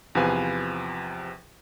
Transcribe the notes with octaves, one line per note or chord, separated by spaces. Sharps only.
E2 C3 F3 B4 F5 G#5